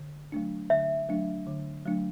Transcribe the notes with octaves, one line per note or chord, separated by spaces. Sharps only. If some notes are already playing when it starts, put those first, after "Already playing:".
Already playing: D3
F#3 A3 D4
D3 E5
F#3 A3 D4
D3
F#3 A3 D4